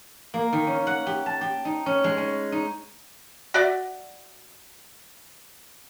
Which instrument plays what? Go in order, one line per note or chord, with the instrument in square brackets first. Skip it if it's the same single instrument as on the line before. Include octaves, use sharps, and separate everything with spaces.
[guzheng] A#3
D#3
C#4
F#5
G4
A5
G4
D#4
C#4
G#3
C#4
D#4
[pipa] F#4 D5 E5